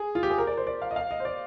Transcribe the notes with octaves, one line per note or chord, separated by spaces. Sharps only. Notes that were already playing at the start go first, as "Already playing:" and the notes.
Already playing: G#4
F4
G4
G#4
A#4
D5
C5
D5
F5
D#5
F5
D#5
C5
D5